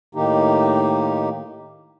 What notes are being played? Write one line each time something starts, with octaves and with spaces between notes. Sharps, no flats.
A2 D#3 A#3 D#4 G4